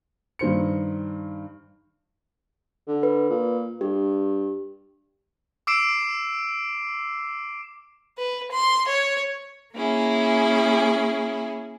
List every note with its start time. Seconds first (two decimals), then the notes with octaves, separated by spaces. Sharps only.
0.39 G2 D#3 C5 C#7
2.88 D3
3.03 B4
3.30 A#2
3.81 G2 G4
5.67 D6 E6 C7 D7 E7
8.18 B4
8.52 C6
8.88 C#5
9.74 A#3 C#4 E4 G#4